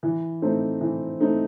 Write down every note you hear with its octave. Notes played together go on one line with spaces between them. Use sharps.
E3
A3 C4 D#4
E3
A3 C4 D#4